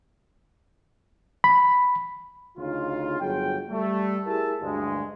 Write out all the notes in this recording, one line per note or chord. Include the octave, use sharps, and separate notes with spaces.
B5
D2 C#3 D#4 F4
G1 F#3 G#4 G5
G3 A3
E4 G4 G#4 A#4 E5 A5
D2 G2 G#3